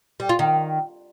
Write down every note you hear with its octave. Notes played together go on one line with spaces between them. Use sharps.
G3
F4
D#3